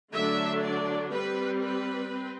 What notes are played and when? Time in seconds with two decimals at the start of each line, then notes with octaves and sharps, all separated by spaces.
0.13 D3 F#3 A3 D4 E5
0.62 D5
1.10 G3 C4 B4
1.60 B4
2.09 C4